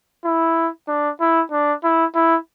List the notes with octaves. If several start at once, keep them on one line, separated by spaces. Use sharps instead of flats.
E4
D4
E4
D4
E4
E4